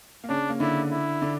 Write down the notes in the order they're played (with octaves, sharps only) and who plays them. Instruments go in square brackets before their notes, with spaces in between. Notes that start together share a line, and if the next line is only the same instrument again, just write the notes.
[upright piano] A#3
[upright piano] C#3 C#4 [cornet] D4
[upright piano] A#3
[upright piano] D3 D4 [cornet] E4
[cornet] E4
[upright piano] D3 D4